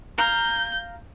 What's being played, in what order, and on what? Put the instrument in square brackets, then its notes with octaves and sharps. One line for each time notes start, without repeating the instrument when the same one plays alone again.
[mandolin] F5 A#5 [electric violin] G6